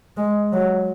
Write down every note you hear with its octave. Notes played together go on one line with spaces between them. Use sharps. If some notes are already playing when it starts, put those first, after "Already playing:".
G#3
F#3